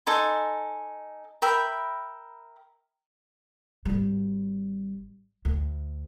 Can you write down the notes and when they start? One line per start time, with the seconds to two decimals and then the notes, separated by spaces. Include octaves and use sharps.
0.06 D#4 A4 G#5 C6
1.42 A#4 E5 G5 B5
3.85 G#1 G3
5.45 D2 A3